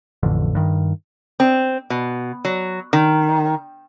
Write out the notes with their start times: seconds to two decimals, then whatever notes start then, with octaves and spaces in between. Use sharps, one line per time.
0.23 A1 F2 D3
0.55 G2 D#3
1.40 C4
1.90 B2
2.45 F#3
2.93 D#3